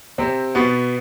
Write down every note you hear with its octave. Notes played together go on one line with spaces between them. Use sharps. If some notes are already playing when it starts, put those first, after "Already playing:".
C3 C4
B2 B3